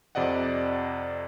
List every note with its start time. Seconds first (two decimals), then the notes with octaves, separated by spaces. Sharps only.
0.15 F2 C3 D5 D#5 F#5